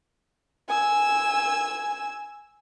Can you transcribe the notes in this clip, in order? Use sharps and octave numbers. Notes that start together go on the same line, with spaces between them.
G#5 E6